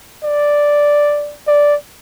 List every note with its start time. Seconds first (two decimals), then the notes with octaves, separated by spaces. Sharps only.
0.23 D5
1.47 D5